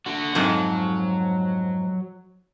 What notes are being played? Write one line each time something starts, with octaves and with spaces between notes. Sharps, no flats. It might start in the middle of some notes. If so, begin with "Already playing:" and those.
D3 F#4
F2 G#2 F#3